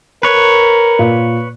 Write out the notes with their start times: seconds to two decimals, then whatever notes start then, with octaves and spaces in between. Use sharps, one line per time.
0.23 A#4 B4 C#5
0.99 A#2